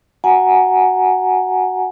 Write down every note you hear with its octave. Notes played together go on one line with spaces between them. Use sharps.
F#4 F#5 G#5 A#5